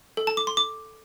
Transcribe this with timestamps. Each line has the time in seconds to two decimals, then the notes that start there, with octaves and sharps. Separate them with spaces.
0.17 A4
0.27 A5
0.37 D6
0.47 C6
0.57 D6